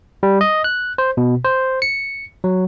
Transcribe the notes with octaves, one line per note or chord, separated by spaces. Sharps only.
G3
D#5
F#6
C5
B2
C5
C#7
F#3